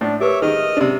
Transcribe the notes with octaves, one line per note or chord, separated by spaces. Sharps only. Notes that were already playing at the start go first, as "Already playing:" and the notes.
A2 D4 D#5
G4 A#4 B4 C#5 E5 D6
D#3 G#4 D#5 D#6 F6
C3 D4